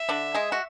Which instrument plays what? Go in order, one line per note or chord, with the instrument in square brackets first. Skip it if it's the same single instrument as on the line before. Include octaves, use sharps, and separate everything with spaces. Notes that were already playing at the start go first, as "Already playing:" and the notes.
Already playing: [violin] E5
[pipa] D3 D4
G#3 G#4
F#4